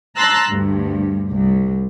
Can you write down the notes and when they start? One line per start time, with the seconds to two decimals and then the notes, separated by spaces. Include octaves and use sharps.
0.16 A5 A#5 C6 E6 F#6 A6
0.49 D2 G2
1.33 C2